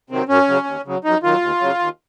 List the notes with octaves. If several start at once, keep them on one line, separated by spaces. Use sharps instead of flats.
C3 D#3 F#3 C4
F#2 C#4
C#3 F#3
D#2
C#3 F#3
F#2 D#4
D#3 F#3 F4
D#2
C#3 F#3
D#2